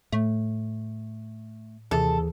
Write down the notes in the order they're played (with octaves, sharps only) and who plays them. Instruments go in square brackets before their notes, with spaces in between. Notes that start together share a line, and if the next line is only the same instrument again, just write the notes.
[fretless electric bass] A2 [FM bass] A3
[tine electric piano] D#2 E3 G#4 [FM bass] C3 [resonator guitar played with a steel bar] A4